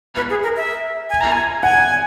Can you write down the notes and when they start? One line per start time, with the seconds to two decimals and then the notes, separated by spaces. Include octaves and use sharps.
0.16 B4
0.30 G#4
0.43 A#4
0.56 E5
1.10 G#5
1.21 A#5
1.32 G#5
1.63 F#5 G#5